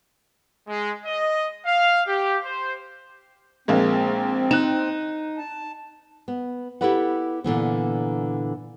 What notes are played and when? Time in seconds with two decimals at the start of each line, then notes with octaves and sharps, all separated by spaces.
0.69 G#3
1.06 D#5
1.66 F5
2.07 G4
2.45 C5
3.68 A#1 G#3 A#3 C4
4.51 D#4 F#6 E7
5.38 A5
6.28 B3
6.81 E4 G4 A4 B4 D5 F#5
7.44 A#2 D3 E3 B3